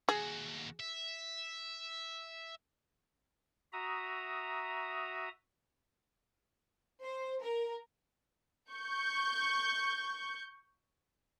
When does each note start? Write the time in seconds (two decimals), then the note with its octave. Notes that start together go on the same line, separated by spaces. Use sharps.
0.09 D#2 F#4 G#4
0.80 E5
3.73 F#4 E5 A#5 D#6
7.02 C5
7.42 A#4
8.73 C#6 G6